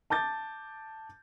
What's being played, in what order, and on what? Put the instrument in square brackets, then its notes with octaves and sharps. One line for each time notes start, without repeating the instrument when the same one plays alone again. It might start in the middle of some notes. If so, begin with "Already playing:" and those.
[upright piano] A5 D6 G6 A6